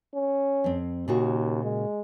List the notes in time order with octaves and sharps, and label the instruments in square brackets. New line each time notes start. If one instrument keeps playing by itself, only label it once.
[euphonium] C#4
[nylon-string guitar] F2 C4
[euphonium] D#2 [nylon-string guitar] A#2 C#3 F#4
[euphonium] G#3